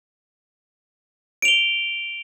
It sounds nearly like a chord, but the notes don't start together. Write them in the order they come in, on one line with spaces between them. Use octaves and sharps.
D7 F7 G7